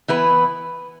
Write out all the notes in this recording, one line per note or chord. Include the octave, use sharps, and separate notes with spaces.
E3 B3 E4 B4